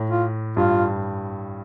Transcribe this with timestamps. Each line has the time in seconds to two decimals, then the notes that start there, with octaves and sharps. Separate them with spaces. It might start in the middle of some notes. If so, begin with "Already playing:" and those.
Already playing: A2
0.10 F4
0.57 G2 F4